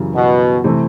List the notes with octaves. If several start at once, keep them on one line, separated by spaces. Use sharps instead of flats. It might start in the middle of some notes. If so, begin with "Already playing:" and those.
Already playing: F#2 C#3 E3 G3
B2
C3 E3 A3 C4